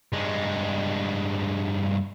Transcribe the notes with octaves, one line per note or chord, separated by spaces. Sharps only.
G2 G#3